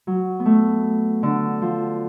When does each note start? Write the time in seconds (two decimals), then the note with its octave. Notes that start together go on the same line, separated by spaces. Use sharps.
0.07 F#3
0.40 B3
0.46 A3
1.23 D3
1.62 F3